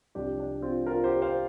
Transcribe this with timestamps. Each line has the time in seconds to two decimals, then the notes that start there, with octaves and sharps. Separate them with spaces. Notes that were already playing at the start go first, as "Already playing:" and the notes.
0.15 C2 C3 F3 D4 G4
0.39 D4
0.62 C4 F4
0.86 F4 A#4
1.04 G4 C5
1.22 C5 F5